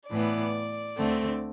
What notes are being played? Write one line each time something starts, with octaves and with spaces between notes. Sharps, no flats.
A2 E3 B3 D5
D2 D3 A3 C4